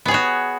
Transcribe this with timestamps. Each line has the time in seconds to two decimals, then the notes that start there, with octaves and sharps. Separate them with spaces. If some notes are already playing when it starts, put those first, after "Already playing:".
0.05 B3
0.08 G#4
0.11 C#5
0.14 F#4